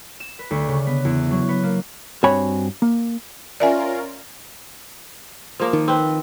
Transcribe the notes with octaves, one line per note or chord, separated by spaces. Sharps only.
E7
B4
D2
C#3
B3
E2
F#3
B3
A#3
G2 C4 F#4 C#5 G#5 B5
A#3
C#4 F4 A#4 D5 E5 G#5
F3 A#3 A#4
D#3
C4 B4